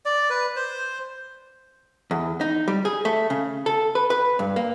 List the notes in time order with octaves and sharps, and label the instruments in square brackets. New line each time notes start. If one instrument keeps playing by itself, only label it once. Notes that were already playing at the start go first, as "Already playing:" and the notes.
[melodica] D5
B4
C5
[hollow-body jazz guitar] E2
D#4
G3
G#4
A3
C#3
A4
B4
B4
G2
A#3